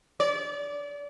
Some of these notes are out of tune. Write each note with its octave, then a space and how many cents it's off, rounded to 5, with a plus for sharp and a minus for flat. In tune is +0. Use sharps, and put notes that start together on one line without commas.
D5 -30